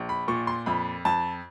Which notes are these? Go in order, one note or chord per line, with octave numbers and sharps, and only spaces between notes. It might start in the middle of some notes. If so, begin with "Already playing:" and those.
Already playing: A#1
B5
A#2 C#6
C6
F2 B5
F2 A5